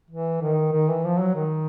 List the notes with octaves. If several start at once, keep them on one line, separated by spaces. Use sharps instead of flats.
E3
D#3
D#3
E3
F3
F#3
D#3